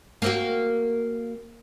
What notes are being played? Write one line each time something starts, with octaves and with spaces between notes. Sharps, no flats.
A#3 C4 F#4